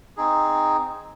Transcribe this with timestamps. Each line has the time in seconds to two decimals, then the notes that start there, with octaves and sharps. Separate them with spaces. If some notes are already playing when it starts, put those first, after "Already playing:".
0.17 C4 D#4 G#4